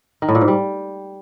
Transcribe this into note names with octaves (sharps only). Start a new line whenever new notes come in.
D#3
A2
A#2
G#2
G3